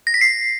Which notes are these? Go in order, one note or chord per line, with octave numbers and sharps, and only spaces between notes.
A#6
B6
C7